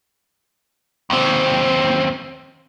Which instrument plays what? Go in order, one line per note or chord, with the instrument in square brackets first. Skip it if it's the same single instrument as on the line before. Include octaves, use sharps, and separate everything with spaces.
[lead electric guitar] D#2 C4